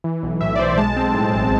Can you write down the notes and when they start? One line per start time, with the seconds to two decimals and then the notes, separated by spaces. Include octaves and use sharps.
0.04 E3
0.23 B1
0.41 A2 E5
0.55 D5
0.59 B1 C5
0.78 G#3 A5
0.96 C4
1.14 A2
1.33 A1